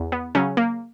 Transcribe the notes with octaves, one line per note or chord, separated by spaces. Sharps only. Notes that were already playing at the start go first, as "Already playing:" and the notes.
Already playing: E2
B3
C#3 F#3 C#4
A#3